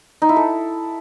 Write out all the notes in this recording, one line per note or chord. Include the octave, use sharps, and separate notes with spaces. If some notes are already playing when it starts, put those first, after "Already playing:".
D#4
E4
A4